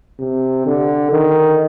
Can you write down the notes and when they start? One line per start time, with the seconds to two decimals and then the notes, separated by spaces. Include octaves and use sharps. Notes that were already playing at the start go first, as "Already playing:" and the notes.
0.19 C3
0.66 D3
1.12 D#3